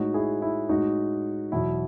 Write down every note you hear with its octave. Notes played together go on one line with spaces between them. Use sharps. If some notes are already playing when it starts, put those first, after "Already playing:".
Already playing: A2 G#3 D#4 F#4
E4 G#4
E4
A2 G#3 D#4 F#4
E2 B2 F#3 E4